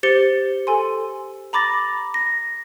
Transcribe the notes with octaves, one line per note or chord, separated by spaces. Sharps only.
G4 C5 A6 C#7 G7
A4 G#5 C6
A#5 B5 D6 A6 A#6
A#6